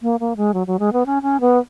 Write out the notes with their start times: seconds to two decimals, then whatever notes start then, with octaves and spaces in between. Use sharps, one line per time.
0.02 A#3
0.20 A#3
0.37 G#3
0.54 F#3
0.67 F#3
0.79 G#3
0.93 B3
1.06 C#4
1.22 C#4
1.41 B3